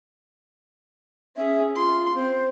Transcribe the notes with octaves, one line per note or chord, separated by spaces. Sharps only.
C#4 G#4 E5
F4 C6
C4 C5